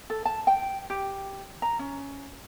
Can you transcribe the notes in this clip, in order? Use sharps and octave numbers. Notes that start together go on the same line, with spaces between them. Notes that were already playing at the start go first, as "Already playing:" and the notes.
A4
A5
G5
G4
A#5
C#4